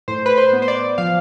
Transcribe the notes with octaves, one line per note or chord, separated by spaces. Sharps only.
A2 C5
B4
C5
B3
C5
D5
F3 F5